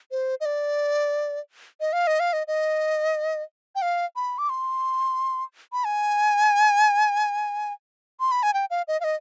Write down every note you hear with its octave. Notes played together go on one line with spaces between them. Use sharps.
C5
D#5
D5
D#5
F5
D#5
F5
D#5
D#5
G5
F5
B5
D6
C6
B5
G#5
C6
B5
G#5
G5
F5
D#5
F5
D#5